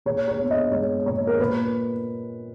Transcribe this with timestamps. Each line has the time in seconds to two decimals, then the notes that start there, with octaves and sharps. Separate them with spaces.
0.06 A#2 C#5
0.28 C#5
0.39 B3
0.51 D#5
0.72 G#3 C#5
1.06 A#2 C#5
1.27 A#4
1.40 A#2 B4